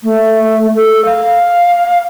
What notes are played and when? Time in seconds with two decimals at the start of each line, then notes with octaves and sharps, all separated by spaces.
0.03 A3
0.76 A4
1.05 F5